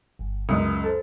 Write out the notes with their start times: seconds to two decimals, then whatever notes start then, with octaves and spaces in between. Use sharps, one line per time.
0.19 G1
0.49 C#2 F#2 E5 D#6
0.84 A4 C5